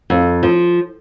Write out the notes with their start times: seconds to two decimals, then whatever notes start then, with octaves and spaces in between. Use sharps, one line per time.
0.10 F2
0.43 F3